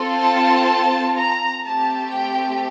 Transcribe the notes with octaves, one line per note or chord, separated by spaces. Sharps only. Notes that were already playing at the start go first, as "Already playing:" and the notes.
Already playing: C4 F4 A4
A5
A#5
A3 C4 G4 A5
G5